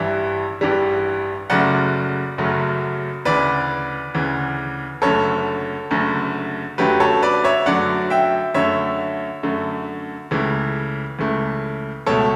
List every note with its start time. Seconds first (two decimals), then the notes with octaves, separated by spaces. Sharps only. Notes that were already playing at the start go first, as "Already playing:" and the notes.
Already playing: A1 G2 E3 G3 E5
0.61 A1 G2 E3 G3
1.50 F#1 F#2 C#3 F#3 A3 D5 F#5
2.38 F#1 F#2 C#3 F#3 A3
3.25 D2 C#3 E3 B4 D5
4.15 D2 C#3 E3
5.02 F#1 F#2 D3 A3 A4 C#5
5.91 F#1 F#2 D3 A3
6.78 F#2 D3 F#3 A3 G4 B4
7.00 A4 C#5
7.22 B4 D5
7.44 C#5 E5
7.66 F#2 D3 F#3 A3 D5 F#5
8.10 E5 G5
8.54 F#2 D3 A3 C#5 E5
9.43 F#2 D3 A3
10.31 C#2 C#3 E3 A3
11.19 C#2 C#3 E3 A3
12.07 C#2 B2 A3 A4 C#5